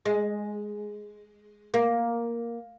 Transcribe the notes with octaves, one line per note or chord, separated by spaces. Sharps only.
G#3
A#3